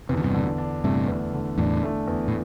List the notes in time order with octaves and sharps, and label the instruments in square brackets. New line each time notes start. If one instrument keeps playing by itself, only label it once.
[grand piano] E2 [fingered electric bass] C3
[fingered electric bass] D3
G2 C3
[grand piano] D3
D4
[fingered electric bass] G2 C3 [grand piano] A3
[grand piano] E2
D3
[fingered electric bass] E2 A2 [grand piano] D4
[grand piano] A3
E2
[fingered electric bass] A2